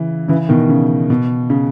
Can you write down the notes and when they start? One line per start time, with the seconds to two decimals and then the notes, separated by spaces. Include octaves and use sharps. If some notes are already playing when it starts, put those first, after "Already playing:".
Already playing: C#3 E3
0.28 C#3 E3
0.49 B2 D#3
0.69 C#3
1.10 B2
1.50 C#3